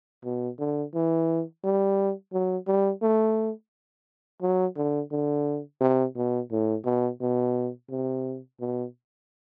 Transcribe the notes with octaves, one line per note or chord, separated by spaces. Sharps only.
B2
D3
E3
G3
F#3
G3
A3
F#3
D3
D3
C3
B2
A2
B2
B2
C3
B2